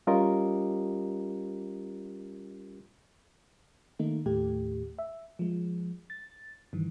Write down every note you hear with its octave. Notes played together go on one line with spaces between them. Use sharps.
G3 C#4 F4 G4 A#4 D#5
D#3 A3 A#3 D#4
D#2 A2 A3 G4
E5
F3 G#3
A6
G2 D#3 E3